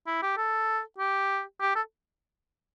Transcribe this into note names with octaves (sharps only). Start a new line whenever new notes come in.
E4
G4
A4
G4
G4
A4